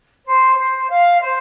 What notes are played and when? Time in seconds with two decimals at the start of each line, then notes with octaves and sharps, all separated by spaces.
0.24 C5
0.58 C5
0.90 F5
1.21 C5